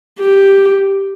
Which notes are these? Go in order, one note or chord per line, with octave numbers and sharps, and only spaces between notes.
G4